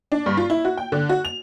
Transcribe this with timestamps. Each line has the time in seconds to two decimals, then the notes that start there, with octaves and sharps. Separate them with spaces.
0.12 D4
0.26 G2
0.37 F4
0.50 E4
0.65 F#4
0.77 G5
0.92 D3
1.09 F#4
1.25 F7